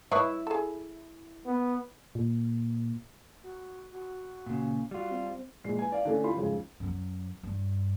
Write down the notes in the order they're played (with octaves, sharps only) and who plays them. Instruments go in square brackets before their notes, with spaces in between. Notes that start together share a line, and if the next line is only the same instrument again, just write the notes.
[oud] E4 [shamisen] B4 C#5 D#5
[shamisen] G#4 A4
[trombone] B3
[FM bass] A#2
[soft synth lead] F#4
F#4
[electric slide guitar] A#2 C#3
[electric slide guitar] G3 F4 [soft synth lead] F#4
[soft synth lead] C4
[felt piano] A#1 G#3 C7
B4 G#5
D5 F5
D3 A3 C#4
F4 G4 F5 B5 C6
F2 G#2 C#3
[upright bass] F#2 F#3
G2